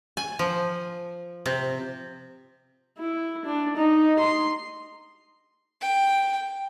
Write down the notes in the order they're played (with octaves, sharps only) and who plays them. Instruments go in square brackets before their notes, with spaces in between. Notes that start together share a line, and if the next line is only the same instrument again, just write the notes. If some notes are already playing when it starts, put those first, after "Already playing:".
[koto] G#5
F3
C3
[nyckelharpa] E4
D4
D#4
C6
[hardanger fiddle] G5